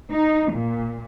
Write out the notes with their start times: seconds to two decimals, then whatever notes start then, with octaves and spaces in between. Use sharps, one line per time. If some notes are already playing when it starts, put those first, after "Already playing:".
0.11 D#4
0.52 A#2